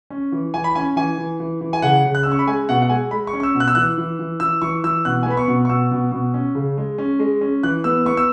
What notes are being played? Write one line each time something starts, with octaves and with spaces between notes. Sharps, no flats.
C#4
E3
E3 G#5
B5
C#4 G#5
E3 G#5
E3
E3
E3
G#5
C#3 F#5
C#3
F#6
C#4 E6
C#6
B5
G#3 G#5
B2 F#5
F#5
G#3 G#5
G#3 B5
C#6
C#4
C#6
E6
B2
F#6
E6
E3 F#6
E3
E3
E3 E6
E3 C#6
E3 E6
B2 F#6
G#5
B3 B5
C#6
B2
C#6
B2 E6
B2
B2
C#4
C#3
G#3
C#4
G#3
C#4
E3 F#6
B3 E6
B3 C#6
E6